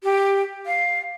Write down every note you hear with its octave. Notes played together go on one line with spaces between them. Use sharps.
G4
F5